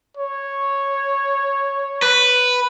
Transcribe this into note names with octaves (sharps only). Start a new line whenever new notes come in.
C#5
B4